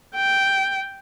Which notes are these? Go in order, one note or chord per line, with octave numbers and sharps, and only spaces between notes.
G5